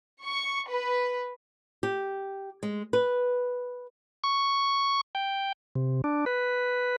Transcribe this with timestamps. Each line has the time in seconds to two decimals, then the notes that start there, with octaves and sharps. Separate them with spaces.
0.24 C#6
0.70 B4
1.83 G4
2.63 G#3
2.93 B4
4.24 C#6
5.15 G5
5.76 C3
6.04 D4
6.26 B4